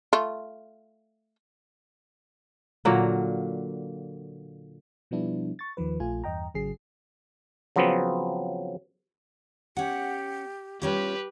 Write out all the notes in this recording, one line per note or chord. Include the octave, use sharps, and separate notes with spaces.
A3 F4
A#2 D3 F#3 A#3
B2 F3 G3 B3 D4 E4
C#6 A6
D#2 D#3 F3 B4
A#1 A3 F4 G#5
E2 G2 D#5 G5 A#5
G#1 C#3 F#3 G#4 C7
C#3 F3 F#3 B3 C4
C#4 G4 F#5
G3 C#4 F4 G4 B4